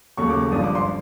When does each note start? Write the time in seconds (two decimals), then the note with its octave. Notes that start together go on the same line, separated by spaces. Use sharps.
0.17 D#2 C#3 F#3 A3 C#6
0.30 D6
0.41 D6
0.52 G#1 G2 D3 F3 D#6
0.64 D6
0.75 C6